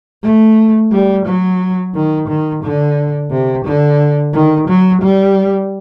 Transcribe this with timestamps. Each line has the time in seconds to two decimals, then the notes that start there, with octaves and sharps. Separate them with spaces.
0.23 A3
0.92 G3
1.26 F#3
1.94 D#3
2.28 D#3
2.63 D3
3.31 C3
3.65 D3
4.34 D#3
4.68 F#3
5.02 G3